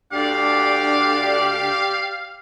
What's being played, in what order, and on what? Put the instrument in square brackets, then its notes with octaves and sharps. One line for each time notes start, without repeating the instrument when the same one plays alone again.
[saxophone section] D2 D3 D4 [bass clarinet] G4 [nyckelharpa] D5 D6 [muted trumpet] F5